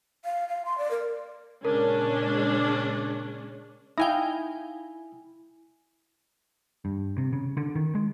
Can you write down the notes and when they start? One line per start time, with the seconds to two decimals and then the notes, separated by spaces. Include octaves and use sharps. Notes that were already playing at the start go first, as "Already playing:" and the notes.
0.25 F5
0.48 F5
0.65 C6
0.78 D5
0.91 A#4
1.65 A#2 C#3 G#3 C#4 D4 A#4
3.98 D#4 E4 F5 G5 G#5
6.85 G2
7.18 C3
7.33 C#3
7.57 D3
7.75 D#3
7.95 G#3